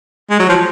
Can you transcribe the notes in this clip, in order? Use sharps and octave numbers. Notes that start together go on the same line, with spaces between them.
G#3
F#3
F3